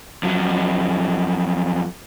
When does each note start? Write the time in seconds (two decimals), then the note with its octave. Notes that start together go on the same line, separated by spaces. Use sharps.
0.23 F2 F#3